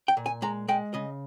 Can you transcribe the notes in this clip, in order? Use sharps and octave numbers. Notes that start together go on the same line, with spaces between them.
G5
A#2
G#5
G#3 A#5
G#3 G5
C#3 D#5